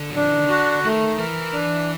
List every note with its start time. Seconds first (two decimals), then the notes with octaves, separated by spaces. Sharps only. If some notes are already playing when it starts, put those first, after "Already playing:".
Already playing: D3
0.10 F#3
0.16 F3 D4
0.30 E3
0.40 D#3
0.50 D3 F#4
0.85 D#3 A3
1.18 E3 A#4
1.53 D4